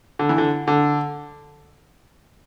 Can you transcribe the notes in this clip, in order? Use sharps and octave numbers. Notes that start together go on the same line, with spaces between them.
D3
E3
D3
D3